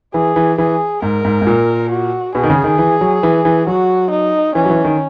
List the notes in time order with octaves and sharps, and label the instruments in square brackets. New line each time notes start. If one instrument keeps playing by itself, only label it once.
[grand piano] E3 [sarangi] G#4
[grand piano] E3
[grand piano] E3 [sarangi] G#4
[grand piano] G#2 [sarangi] A#4
[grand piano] G#2
G#2
A#2
[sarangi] F#4
[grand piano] B2 [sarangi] G#4
[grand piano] D#3
C#3
D#3
E3
F#3
E3
E3
[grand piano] F#3 [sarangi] F#4
[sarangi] D#4
[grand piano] E3 [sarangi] C#4
[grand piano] F#3
E3
D#3